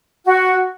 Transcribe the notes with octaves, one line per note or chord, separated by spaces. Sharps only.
F#4